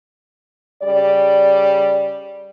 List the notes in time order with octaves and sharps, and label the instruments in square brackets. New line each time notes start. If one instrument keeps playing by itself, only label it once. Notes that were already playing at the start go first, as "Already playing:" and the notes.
[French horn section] C#3 G3 D5